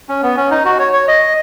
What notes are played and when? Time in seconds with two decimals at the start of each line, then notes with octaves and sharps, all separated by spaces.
0.09 C#4
0.23 B3
0.37 C#4
0.51 D#4
0.65 F#4
0.79 C#5
0.93 C#5
1.08 D#5